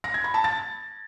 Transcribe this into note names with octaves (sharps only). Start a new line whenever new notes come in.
A#6
G#6
B5
A5
A6